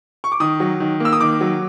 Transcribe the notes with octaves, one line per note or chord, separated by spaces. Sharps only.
C#6
D6
D#3 D#6
F#3
D#3
A#3 E6
D#6
D#3 D6
F#3